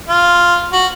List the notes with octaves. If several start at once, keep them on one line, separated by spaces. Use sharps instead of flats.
F4
F#4